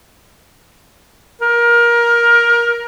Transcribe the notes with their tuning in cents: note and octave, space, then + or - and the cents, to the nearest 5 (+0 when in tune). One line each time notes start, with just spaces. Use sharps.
A#4 +20